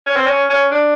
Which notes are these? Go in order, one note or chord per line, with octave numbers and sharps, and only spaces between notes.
C#4
C4
C#4
C#4
D4